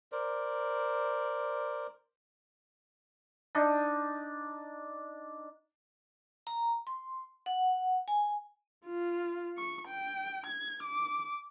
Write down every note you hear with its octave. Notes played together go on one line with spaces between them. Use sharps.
A#4 C5 D5
D4 D#4
A#5
C6
F#5
G#5
F4
C#6
G5
G#6
D6